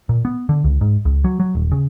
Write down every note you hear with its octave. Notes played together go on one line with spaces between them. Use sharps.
A#2
B3
D3
C#2
G#2
C#2
F#3
F#3
D#1
C#3